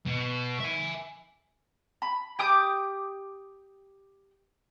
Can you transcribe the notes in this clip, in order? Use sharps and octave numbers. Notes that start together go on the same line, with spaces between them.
B2
E5 G#5
B5
G4 D6 D#6 G6